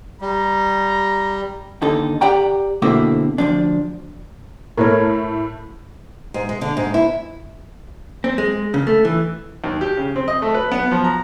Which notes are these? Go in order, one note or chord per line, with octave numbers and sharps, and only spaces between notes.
G3 A#5
D#2 D3 D#4 A4
G4 D5 F#5 G5 A#5
B2 D3 A3 A#3 C4 E4
D2 F3 D4
A2 A3 A#4 C#5
G#2
G#3
D3
G#2
E4
C4
G#3
C#3
A3
E3
D#2
G4
C#3
C4
D#5
A3
B4
B3
F3
A#5